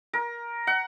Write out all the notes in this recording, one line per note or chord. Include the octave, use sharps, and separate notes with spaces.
A#4
F#5